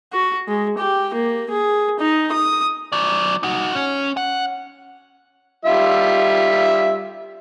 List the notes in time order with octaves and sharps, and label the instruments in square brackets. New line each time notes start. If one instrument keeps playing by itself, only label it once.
[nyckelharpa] F#4
G#3
G4
A#3
G#4
D#4
D#6
[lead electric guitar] F#3 D5
D#4 F#4
C#4
F#5
[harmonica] G3 F4 E5